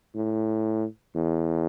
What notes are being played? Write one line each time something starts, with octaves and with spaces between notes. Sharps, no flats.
A2
E2